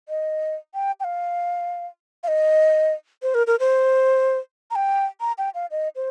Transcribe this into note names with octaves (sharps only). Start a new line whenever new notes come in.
D#5
G5
G5
F5
F5
D#5
C5
A#4
A#4
C5
A#5
G5
A#5
G5
F5
D#5
C5